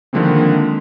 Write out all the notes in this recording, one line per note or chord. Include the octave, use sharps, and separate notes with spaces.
D3 D#3 F3 G#3 A#3 C4